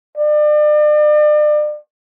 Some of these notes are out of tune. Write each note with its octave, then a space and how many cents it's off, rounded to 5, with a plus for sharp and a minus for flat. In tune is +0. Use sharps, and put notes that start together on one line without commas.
D5 +40